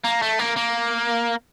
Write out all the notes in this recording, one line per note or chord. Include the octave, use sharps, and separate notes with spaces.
A#3
A3
A#3
A#3